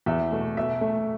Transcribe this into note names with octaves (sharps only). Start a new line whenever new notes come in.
E2 E5
B2 A3
B2 E5
A3